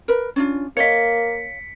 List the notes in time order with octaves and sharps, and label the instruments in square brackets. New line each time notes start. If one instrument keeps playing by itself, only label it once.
[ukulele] A#4 B4
C#4 D4 F4
[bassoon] A#3 [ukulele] C#5 D#5 F5 [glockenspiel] B6 C#7